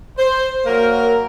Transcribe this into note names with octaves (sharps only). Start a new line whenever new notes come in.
C5
F#3 A#3 A#4